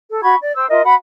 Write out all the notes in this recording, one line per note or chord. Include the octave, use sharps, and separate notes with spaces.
A4
F#4 B5 C#6 G#6
D5
C5 G5 E6
F4 A#4 D#5 E5
F#4 F#5 B5